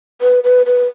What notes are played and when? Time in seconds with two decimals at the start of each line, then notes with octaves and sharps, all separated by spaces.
0.21 B4
0.44 B4
0.66 B4